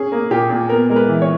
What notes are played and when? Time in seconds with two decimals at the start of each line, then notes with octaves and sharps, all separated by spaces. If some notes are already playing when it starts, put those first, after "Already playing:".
Already playing: C#4 G#4
0.12 A#3
0.30 A#2 G4
0.50 A#2
0.69 B3 A#4
0.90 G#3 A#4
0.96 B4
1.09 E3
1.22 C#5